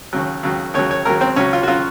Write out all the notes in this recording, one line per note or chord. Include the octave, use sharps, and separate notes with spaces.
D#2 C#3 F#3
D#2 C#3 F#3
D#2 C#3 F#3 C#5
C#5
D#2 C#3 F#3 A#4
C4
C#2 C#3 F#3 C#4
F4
F#4
C#3 F#3 F4